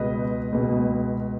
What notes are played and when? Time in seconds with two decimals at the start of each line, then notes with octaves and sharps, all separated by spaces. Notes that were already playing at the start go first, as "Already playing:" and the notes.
Already playing: C#2 B2 B4 D#5
0.52 C#2 B2